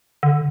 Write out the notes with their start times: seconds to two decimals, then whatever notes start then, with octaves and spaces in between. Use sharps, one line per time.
0.23 D3